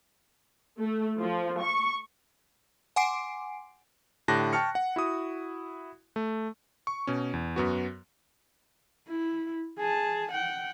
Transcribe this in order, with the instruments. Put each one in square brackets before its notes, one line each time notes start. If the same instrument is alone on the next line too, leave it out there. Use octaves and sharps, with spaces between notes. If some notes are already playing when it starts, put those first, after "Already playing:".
[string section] A3
F3
C#6
[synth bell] F#5 G#5 C6 D6 C7 D7
[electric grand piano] A2 D3 G4 A5 F#6 A#6
G5 A5 C#6 F6 C#7
F#5
E4 F#4 D#6
A3
C#6
B2 C#4
E2
F#2 B3 F#4
[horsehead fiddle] E4
G#4 A5
F#5 G5